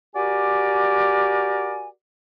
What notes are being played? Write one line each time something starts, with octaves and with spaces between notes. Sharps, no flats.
F#4 G4 A#4 D5 G#5